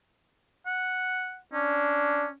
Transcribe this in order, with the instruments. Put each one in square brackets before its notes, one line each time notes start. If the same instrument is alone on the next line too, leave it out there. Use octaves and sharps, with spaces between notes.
[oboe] F#5
[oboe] C#4 [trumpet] D4